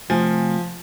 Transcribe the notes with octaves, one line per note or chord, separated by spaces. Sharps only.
C3 F3 A3 G#5